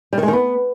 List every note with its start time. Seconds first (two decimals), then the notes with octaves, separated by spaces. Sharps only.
0.13 G3
0.18 D#3
0.23 G#3
0.28 D#3
0.33 B3